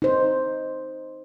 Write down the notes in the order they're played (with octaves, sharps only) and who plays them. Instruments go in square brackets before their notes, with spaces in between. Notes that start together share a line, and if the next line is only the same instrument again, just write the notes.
[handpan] D#4 C5